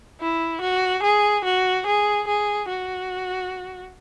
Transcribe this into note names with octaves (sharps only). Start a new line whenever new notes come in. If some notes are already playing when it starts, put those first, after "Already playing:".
E4
F#4
G#4
F#4
G#4
G#4
F#4